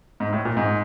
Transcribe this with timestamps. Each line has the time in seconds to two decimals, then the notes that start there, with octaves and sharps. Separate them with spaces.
0.20 G#2
0.33 A2
0.45 A#2
0.57 G#2